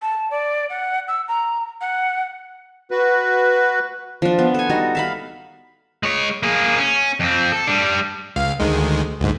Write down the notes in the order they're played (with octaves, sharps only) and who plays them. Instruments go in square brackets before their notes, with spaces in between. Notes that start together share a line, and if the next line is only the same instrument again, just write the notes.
[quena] A5
D5
F#5
E6
A#5
F#5
[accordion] F#4 B4
[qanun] F3 D4
B3
A4 G#5
G3 D#4 F#4
E5 F5 B5
[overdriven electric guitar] G#3 C#5
A#3 G#4
C#4
F2 C4
A4
G3 D4
[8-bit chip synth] C#2 F5
D2 D#3 G#3
D2 G#2